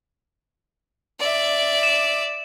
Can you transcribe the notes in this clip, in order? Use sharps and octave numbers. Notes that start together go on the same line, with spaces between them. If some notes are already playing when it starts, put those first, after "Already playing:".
D5 E5
E7